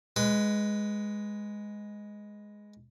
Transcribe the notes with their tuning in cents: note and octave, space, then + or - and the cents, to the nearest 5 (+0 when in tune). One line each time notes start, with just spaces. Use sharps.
G#3 +0 B4 +0 C6 -45